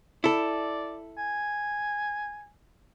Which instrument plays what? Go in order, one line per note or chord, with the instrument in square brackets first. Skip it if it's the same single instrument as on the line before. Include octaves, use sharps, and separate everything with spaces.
[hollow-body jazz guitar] E4 A4 [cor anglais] D5
[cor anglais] G#5